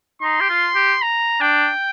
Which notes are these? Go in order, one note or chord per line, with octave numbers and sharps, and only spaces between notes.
D#4 C6
G4
F4
G4
A#5
D4 G5